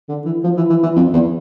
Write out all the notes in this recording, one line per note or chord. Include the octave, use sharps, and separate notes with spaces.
D3
E3
F3
E3
E3
E3
F2
E2